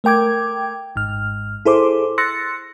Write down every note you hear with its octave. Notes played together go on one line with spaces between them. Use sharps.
A3 A#4 G5 D6 G#6
G#1 G#2 F6
E4 G#4 A4 C5 C6 D6
C6 E6 F#6 A6 A#6 C#7